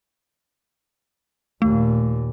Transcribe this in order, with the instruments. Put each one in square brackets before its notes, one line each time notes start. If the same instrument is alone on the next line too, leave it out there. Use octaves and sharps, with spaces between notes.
[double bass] D#2 A#2 [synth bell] A3